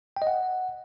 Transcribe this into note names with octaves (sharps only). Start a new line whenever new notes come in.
G5
D#5
F#5